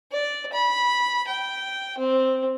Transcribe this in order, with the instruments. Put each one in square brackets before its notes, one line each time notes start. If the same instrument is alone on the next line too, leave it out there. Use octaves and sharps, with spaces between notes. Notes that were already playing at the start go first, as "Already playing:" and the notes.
[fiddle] D5
B5
G5
C4